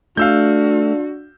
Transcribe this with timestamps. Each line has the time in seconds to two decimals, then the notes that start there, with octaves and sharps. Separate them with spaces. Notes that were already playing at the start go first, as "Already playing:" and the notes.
0.17 A3 D4 F#4 F5 E6 G6